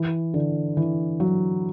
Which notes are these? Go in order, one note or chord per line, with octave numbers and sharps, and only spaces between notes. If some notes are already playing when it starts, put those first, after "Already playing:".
Already playing: E3
D3
E3
F#3